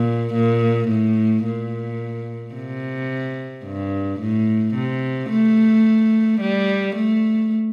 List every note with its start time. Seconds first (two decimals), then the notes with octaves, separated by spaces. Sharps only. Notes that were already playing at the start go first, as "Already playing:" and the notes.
Already playing: A#2
0.34 A#2
0.89 A2
1.45 A#2
2.55 C3
3.64 G2
4.20 A2
4.75 C3
5.29 A3
6.41 G3
6.96 A3